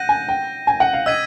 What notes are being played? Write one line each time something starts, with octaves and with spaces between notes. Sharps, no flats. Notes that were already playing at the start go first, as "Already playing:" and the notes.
Already playing: F#5 G6 A#6 D#7
G#5
G5
G#5
F#5
F5
D#5 E6 G#6 B6 D#7